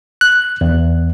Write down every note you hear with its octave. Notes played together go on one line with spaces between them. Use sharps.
F#6
E2